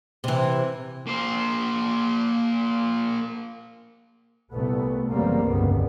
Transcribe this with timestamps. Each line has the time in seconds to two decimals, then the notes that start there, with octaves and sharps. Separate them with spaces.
0.24 C3 E3
1.07 A#3 C5
4.51 C2 A#2 A3 B3
5.10 F#1 E2 F#3 G3 A#3 C4
5.46 F1 C#2 G2 D3 B3